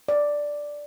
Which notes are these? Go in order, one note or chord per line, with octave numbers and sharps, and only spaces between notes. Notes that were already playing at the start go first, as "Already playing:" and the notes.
D5